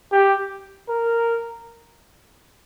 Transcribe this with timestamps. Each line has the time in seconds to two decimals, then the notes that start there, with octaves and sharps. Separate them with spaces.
0.12 G4
0.89 A#4